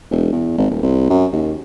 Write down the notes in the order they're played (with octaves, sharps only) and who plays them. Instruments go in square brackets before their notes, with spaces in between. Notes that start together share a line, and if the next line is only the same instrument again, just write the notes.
[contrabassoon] E1
E2
G#1
D#1
C2
F#2
D#2